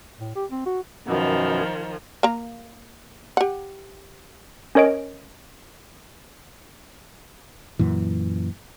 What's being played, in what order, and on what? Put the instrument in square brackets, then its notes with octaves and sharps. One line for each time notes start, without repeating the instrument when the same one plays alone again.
[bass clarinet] A2
G4
C4
F#4
[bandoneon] F#2 B2 B3 [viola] D#3 F3
[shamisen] A#3 A#5
G4 F#5
[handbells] C#4 A#4 C#5 D#5 D7
[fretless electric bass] F#2 A#2 E3